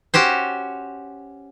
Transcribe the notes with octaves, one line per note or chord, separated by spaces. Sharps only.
C#4 F#4 G4 C5